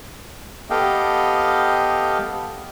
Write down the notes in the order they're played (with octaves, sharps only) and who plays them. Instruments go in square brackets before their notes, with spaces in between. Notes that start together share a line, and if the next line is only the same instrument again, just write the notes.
[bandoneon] B3 G4 A4 D#5 F5 G5